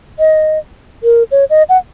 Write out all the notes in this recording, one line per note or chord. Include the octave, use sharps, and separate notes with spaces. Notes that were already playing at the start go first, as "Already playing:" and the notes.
D#5
A#4
C#5
D#5
F#5